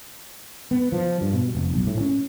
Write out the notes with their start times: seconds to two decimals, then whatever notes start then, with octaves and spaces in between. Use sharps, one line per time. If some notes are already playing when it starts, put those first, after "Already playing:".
0.71 B3
0.92 F3
1.21 G2
1.34 B2
1.55 F1
1.74 B1
1.87 A2
2.01 C#4